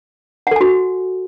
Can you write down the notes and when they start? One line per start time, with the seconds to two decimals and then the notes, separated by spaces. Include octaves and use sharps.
0.47 F#5
0.51 A4
0.56 G#5
0.61 F#4